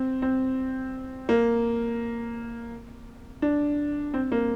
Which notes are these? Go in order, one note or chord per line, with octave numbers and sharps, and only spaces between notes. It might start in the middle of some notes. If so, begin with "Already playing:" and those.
Already playing: C4
C4
A#3
D4
C4
A#3